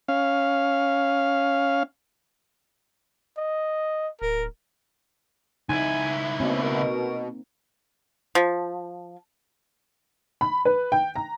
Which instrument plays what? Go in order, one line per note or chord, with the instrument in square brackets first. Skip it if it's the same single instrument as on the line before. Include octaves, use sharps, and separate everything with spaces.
[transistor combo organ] C#4 F5
[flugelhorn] D#5
[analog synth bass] D1 [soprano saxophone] A#4
[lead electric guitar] C#2 E4 [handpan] D#4 [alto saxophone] G#5
[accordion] B2 [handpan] A#3 C4 [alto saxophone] C#4
[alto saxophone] A#4
[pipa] F3
[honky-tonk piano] B5
B4
G5
A#5